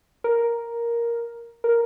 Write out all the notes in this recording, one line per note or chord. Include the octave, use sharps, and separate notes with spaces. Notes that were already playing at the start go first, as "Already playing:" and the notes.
A#4
A#4